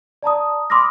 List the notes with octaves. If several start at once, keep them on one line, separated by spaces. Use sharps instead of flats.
D5 A5 A#5 D#6
B5 C6 D6 D#6 F6 A#6